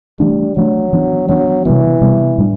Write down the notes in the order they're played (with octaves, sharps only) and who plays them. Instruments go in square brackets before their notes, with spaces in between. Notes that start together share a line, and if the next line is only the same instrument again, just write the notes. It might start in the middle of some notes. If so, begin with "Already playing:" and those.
[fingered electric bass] E3 A3 D4 [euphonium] G3
[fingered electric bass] E3 A3 D4 [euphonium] F#3
[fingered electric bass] E3 B3 D4
[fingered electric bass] E3 B3 D4 [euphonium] F#3
[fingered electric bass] C3 G3 B3 [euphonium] E3
[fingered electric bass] C3 G3 B3
A2 G3 D4